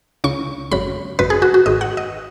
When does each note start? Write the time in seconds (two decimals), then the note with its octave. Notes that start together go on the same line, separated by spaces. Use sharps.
0.24 C#2 C#3 C#6
0.71 G#1 F#2 C#3 B5
1.19 G#1 F#2 C#3 B4
1.30 G#4
1.42 F#4
1.54 F#4
1.66 G#1 G#2 D#3 D#5
1.81 F#5
1.97 D#5